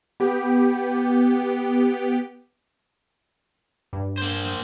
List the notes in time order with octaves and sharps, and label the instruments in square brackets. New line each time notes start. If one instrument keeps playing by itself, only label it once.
[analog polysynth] B3 G4
[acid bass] G2
[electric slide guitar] A#3 C5